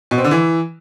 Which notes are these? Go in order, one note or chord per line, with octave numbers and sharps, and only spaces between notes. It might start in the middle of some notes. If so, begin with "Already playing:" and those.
B2
C4
D3
E3